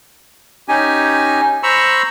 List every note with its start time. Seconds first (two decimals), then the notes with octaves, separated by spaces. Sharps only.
0.68 C#4 D#4 G4 G#5
1.63 C5 A#5 B5 C#6 E6